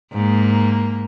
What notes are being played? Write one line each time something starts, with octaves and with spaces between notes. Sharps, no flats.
G#2 A#3